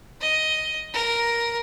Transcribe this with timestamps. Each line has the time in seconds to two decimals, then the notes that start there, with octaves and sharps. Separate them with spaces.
0.21 D#5
0.93 A#4